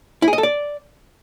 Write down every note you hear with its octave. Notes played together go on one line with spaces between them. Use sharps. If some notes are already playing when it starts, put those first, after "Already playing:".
E4
G#4
D#5
A4
D5